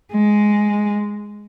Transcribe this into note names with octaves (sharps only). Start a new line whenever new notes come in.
G#3